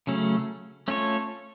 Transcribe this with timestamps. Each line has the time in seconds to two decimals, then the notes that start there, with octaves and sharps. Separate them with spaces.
0.07 C#3 F#3 A3 C#4
0.88 A3 C#4 F4 A4 C#5